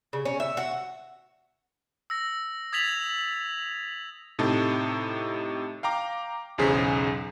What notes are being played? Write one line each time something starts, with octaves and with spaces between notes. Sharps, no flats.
C#3
C#4
E5
F#4
E6 A#6
D#6 G#6 A6 B6 F7 F#7
A2 C3 D#4 A4
F5 G5 A#5 D6
B1 E2 C#3 G#4 C5 B6